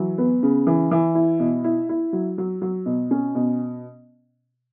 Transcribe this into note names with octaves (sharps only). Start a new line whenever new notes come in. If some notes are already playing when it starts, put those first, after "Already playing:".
Already playing: E3 F#3
B3
C#3
E3
E3
E4
B2
E4
E4
F#3
F#3
F#3
B2
C#4
B2